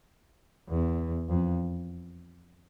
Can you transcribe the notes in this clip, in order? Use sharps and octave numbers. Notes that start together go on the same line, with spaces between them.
E2
F2